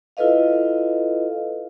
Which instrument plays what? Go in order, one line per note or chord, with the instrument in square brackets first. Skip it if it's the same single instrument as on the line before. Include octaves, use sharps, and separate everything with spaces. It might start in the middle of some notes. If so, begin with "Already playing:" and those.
[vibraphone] E4 F4 A4 B4 D#5 F5